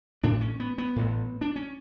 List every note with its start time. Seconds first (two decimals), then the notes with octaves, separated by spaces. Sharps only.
0.23 A1 A2 D4
0.41 C#4
0.60 B3
0.78 B3
0.96 A1 A2
1.41 D4
1.56 C#4